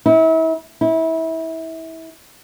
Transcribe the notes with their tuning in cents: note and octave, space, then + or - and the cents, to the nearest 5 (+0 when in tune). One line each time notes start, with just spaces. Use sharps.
E4 -35
E4 -25